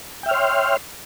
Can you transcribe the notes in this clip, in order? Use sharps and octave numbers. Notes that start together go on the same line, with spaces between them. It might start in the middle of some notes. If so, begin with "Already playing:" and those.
C#5 E5 G5 C6 F6